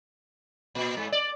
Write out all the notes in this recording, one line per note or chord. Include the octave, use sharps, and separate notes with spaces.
A#2
G#2
D5